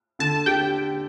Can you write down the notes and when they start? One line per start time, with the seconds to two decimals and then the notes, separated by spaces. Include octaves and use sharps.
0.19 D3 A5
0.46 G4 G5